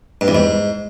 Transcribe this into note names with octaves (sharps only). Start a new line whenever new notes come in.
G2
E2
G#2